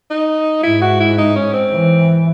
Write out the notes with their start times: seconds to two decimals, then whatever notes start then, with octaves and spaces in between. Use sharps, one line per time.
0.10 D#4
0.63 G#2 E4
0.82 F#4
1.00 E4
1.18 D#4
1.36 C#4
1.53 C4
1.71 E3